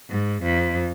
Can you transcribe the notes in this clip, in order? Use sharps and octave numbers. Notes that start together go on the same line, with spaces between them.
G#2
F2